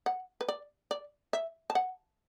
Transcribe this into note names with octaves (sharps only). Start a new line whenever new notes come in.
F#5
B4
D5
D5
E5
A5
F#5